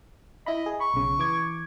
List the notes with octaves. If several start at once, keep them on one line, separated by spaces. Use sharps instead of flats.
E4 D#5 B5
G#4
B5 C#6
B1 C#3
E3 D6 G#6